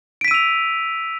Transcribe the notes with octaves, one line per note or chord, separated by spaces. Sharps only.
E6 B6 D7 D#7 F7